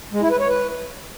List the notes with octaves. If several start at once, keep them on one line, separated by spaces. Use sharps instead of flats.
G#3
E4
B4
C#5
B4